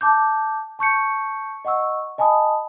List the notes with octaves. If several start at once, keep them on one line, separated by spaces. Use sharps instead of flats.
A5 D6 G6
A5 C#6 G6 C#7
D#5 F#5 C#6 E6
D#5 G#5 A5 B5 D#6